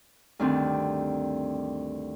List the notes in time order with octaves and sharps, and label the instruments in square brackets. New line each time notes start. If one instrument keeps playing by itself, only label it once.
[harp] D2 G2 D#3 C4 D4